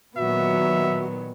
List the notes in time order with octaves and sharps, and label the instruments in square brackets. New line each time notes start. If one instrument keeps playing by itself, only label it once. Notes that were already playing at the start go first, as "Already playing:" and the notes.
[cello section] A#2 D#3 F#3 [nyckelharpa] B3 [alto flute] F#4 [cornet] E5